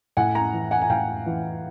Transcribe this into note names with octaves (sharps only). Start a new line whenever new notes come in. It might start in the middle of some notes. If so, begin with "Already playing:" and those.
A2 F#5 G#5
G#5 A#5
E3
F#5 G#5
G#5
A2 F5 G5
E3